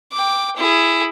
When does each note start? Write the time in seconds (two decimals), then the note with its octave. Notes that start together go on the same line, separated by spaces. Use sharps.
0.12 G5 D6
0.56 E4 G#4